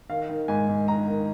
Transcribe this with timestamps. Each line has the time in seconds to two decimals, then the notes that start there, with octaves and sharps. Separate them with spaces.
0.10 D#3 F5
0.29 D#3
0.48 G#2 G#5
0.69 G#2
0.88 D#3 A#5
1.08 D#3